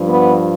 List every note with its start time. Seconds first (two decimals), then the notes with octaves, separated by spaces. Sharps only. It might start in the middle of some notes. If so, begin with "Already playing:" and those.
Already playing: G2 F3
0.08 B3